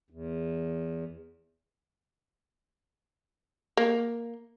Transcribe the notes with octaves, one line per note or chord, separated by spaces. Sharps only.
E2
A#3